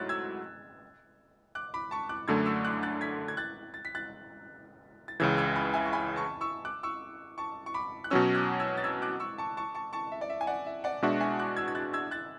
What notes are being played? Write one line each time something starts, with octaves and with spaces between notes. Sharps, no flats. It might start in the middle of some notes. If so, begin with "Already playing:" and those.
Already playing: G#2 F#3 A3 E4 F#6 A6
E6 G#6
D6 F#6
B5 D6
A5 C#6
D6 F#6
F#2 D3 A3 E6 G#6
C#6 E6
D6 F#6
F#6 A6
G#6 B6
G#6
F#6 A6
A6
B6
F#6 A6
A6
C#2 C#3 E3 E6 G#6
E6 G#6
G#5 B5
E5 G#5
C#6
G#5 B5
A5 C#6
C#6 E6
D6 F#6
C#6 E6
A5 C#6
C#6
B5 D6
F#6
B2 F#3 C#4 C#6 E6
D6 F#6
E6 G#6
A6
E6 G#6
D6 F#6
C#6 E6
A5 C#6
A5 C#6
A5 C#6
A5 C#6
E5
D5
E5
G#5
D5 F#5
E5
D5 F#5
B2 G#3 D4 F#4 E5
E5 G#5
D6 F#6
E6 G#6
G#6
F#6 A6
E6 G#6
F#6 A6